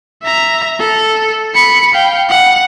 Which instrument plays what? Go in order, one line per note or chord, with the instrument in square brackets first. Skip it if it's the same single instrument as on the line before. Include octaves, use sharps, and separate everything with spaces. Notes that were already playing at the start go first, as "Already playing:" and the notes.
[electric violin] E5 A#5
A4
B5 C#7
F5 G5
F#5